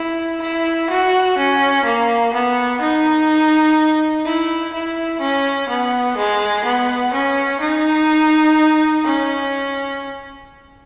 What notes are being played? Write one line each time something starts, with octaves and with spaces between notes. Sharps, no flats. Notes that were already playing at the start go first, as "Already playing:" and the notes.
Already playing: E4
E4
F#4
C#4
A#3
B3
D#4
E4
E4
C#4
B3
G#3
B3
C#4
D#4
C#4